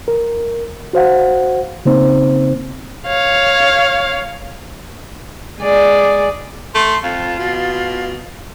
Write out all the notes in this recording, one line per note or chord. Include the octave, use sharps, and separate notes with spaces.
A#4
F#4 C5 F5 F#5
C#3 A#3 C4 D#4 C5
C#5 F5
G#3 G#4 D5
A3 C6
F2 F4
B2